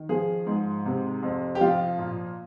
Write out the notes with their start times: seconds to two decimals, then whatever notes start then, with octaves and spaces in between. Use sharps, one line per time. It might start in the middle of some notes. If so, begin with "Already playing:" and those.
Already playing: D#3
0.09 F3 G#4
0.47 G#2
0.86 C3
1.23 F2
1.55 G4
1.61 F3 F4
1.99 A#2